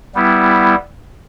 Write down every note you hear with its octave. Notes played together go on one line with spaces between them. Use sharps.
G3 B3 E4